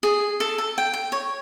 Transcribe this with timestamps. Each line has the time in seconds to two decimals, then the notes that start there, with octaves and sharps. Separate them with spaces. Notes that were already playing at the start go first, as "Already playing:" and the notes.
0.03 G#4
0.40 A4
0.58 A4
0.78 G5
0.94 G5
1.12 C#5